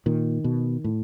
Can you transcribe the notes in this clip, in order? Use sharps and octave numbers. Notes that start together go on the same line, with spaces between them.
A#2 D#3
B2
A2